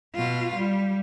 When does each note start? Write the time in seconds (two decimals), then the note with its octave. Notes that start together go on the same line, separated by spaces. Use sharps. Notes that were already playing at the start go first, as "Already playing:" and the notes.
0.15 B2 F4
0.56 G3